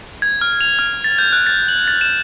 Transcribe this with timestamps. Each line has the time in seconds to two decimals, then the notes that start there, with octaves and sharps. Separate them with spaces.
0.22 G#6
0.41 F6
0.61 F7
0.79 F6
1.04 A6
1.18 G6
1.33 F#6
1.47 A6
1.68 F#7
1.88 A6
2.01 E7